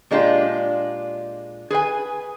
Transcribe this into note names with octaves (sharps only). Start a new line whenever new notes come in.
A#2 G#3 D4 F4 G4
G#4 B4 G#5